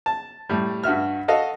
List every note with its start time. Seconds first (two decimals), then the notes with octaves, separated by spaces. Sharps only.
0.06 A5
0.49 A2 G3
0.83 G2 F#4 E5 F6
1.28 F#4 A4 D#5 F5